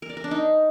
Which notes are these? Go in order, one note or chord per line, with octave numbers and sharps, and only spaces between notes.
A#4
D5
A#4
D4
D#4